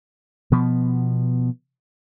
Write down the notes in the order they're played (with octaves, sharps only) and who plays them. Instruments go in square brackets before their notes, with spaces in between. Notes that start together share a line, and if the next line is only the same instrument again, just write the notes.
[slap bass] B2 F3 B3